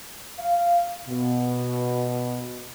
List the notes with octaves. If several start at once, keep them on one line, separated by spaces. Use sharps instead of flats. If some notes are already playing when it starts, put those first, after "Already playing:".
F5
B2